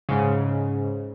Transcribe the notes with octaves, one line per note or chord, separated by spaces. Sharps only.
G#2 C#3